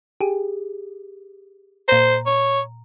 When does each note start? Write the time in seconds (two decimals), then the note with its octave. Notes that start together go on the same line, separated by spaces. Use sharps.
0.21 G4 G#4
1.88 A#2 C5 A#5
2.26 C#5